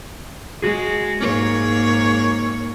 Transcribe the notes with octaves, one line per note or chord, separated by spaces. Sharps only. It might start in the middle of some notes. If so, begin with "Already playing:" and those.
G#3 F#4 G#4
G#2 A#3 C#5